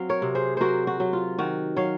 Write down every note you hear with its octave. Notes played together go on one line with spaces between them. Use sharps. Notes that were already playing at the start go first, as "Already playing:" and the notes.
Already playing: F#3 C4 F5
A#4 C#5
C3
G#4 C5
F#3 F#4 A#4 C5
F#4
F#3
F4
D#3 F#4
F#3 C#5 F5